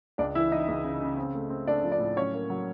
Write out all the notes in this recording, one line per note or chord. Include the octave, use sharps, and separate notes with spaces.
C#2 D4 D5
E3 E4 E5
E3 D#4 D#5
C#2
C#3
C#3
C4
A3
C4
A3 D4 D5
F3
D4 D5
A2
F#3 C#4 C#5
A#3
F#3